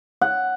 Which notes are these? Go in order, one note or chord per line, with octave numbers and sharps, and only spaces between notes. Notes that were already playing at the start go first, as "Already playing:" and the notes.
F#5